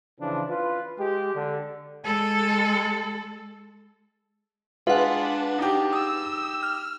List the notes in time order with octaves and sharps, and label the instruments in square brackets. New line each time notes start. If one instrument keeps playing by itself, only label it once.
[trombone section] C#3 E3 F3 D4
F4 B4
G#3 G4
D3
[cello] G#3 A4
[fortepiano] G#3 F4 [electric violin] D4 [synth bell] B4 F#5
[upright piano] D#4 G4
[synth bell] D#6 [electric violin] E6
[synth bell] F6